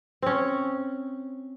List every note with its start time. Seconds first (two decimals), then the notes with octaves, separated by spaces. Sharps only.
0.22 C4 C#4